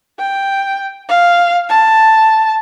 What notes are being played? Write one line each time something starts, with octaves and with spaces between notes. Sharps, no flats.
G5
F5
A5